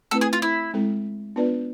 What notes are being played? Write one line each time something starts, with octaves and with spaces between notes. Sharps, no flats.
A3 C4 E4 A4 B4
G#4
F4
E4
G#3 C4 E4 A4
B3 D4 F4 B4 D5